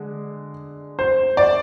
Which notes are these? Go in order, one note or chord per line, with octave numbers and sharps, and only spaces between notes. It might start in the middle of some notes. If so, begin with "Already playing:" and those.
Already playing: D3 G#3
C5
D5